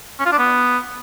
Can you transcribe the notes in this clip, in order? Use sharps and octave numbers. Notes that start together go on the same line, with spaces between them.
C#4
F4
D4
B3